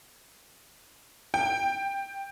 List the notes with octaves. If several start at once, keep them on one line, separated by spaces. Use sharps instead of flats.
G5